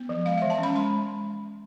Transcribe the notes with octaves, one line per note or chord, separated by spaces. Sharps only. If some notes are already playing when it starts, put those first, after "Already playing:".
Already playing: B3
F3
G#3 F5
E3 E5
A5
C#4 B5
G#3 C6